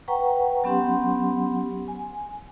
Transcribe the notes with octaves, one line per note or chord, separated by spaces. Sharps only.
B4 F#5 G5 A#5 C#6
F#3 B3 C#4 G4 F#5 C6
G#5